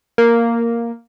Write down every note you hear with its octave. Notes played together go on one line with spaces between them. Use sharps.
A#3